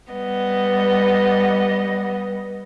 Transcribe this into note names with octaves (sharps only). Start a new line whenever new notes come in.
G3 B3 D#5